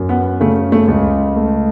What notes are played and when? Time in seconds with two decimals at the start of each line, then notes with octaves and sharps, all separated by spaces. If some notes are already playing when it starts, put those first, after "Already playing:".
Already playing: F#2
0.09 B3
0.41 C#3 A3
0.72 A3
0.88 C#2
1.36 A3